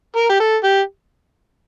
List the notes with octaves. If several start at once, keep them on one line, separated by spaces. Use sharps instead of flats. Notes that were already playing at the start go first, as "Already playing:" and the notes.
A#4
G4
A4
G4